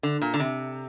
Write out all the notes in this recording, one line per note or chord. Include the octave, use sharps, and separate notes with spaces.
D3
A#2
D3
C3